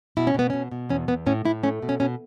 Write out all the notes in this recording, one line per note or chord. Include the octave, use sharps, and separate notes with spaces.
B2 E4
C#4
B2 B3
B2 C#4
B2
E2 C#4
E2 B3
A2 C#4
A2 E4
A3 C#4
B2
C#4
B2 C#4